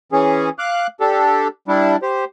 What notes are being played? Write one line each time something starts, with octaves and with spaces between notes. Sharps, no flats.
E3 C#4 G#4
F5 D6 F#6
D4 G4 A4
G3 D4 E4
G4 C5